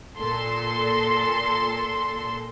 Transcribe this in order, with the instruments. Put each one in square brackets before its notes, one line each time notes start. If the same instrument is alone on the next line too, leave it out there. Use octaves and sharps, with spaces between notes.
[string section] A#2 A4 C6